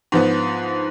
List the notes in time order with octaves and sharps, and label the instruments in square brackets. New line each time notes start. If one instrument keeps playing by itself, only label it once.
[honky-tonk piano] G#2 F3 B3